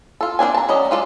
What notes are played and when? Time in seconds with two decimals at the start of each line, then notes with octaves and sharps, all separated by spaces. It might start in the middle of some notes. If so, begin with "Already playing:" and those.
0.21 F4 A4
0.39 A#3 C4 D4 G#5
0.54 A5 A#5
0.69 F#3 C#4 D5 D#5
0.91 G#3 F4 A4 D5